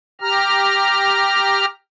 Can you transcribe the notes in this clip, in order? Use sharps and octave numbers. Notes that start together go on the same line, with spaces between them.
G4 A#5 F6